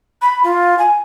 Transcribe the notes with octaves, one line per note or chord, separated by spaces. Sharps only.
B5
F4
G#5